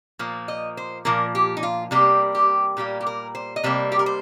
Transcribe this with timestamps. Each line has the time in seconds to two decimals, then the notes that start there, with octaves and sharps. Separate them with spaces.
0.19 A#2 F3 A#3
0.48 D#5
0.77 C5
1.05 A#2 F3 A#3 A#4
1.35 G4
1.57 D#4
1.63 F4
1.91 C3 G3 A#3 G4
2.35 G4
2.77 A#2 G3 A#3 G4
3.01 G4
3.06 A#4
3.35 C5
3.56 D#5
3.63 C3 G3 A#3 C5
3.92 G4
3.99 A#4
4.06 C5